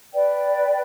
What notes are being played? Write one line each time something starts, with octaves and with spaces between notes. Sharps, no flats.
B4 D5 G5